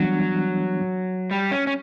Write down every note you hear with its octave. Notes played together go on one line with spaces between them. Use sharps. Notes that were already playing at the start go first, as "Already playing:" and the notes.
Already playing: E3 F#3 G3 B3 D4
G3
C#4
C#4